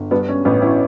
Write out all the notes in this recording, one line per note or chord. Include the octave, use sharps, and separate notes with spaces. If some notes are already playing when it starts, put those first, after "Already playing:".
Already playing: G1
G2 B3 D4
C#4
A1 B3
C#4 E4